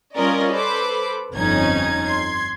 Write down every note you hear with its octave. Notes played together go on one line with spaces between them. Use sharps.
G3 C#4 F4 A#4 D5 D#5
A4 B4 C5 B5 D6
G1 F2 C#4 D#4 G#6
C6 G#6